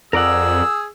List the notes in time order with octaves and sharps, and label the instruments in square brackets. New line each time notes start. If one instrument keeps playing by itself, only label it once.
[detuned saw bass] F2 [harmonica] G#4 E6 [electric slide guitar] A#4 D5 F#5